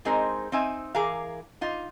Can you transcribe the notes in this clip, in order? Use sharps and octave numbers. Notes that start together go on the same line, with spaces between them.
G#3 C4 D#4 G#4 A#4 C5
C4 D#4 E5 G#5
E3 G#4 A#4 F5
D#4 F4